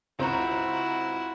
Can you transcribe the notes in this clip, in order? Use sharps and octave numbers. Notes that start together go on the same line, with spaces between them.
C#2 C4 E4 F#4 A#5